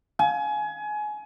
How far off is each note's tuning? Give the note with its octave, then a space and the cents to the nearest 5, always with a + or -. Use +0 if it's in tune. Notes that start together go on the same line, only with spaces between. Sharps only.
G#5 +25